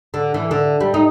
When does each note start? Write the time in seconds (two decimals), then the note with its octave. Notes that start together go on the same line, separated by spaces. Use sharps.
0.14 D3
0.34 E3
0.51 D3
0.80 G3
0.94 D#4